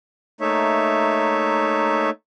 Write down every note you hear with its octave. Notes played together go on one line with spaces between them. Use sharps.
A3 A#3 D#4 C#5 E5